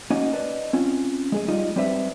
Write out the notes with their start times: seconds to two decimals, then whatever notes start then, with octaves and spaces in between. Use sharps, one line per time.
0.10 A#3 C#4 D#4 F#4
0.33 B4 D5 D#5 A5
0.73 C4 C#4 F4
1.32 G#3 G#4 D#5
1.48 G3 D#4 F4 D#5
1.76 G3 C4 D4 B4 C5 E5